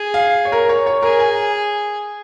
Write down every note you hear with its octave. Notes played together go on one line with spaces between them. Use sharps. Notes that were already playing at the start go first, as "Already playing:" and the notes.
Already playing: G#4
F5
C#5
A#4
C#5
C#5
G#4 A#4
G#5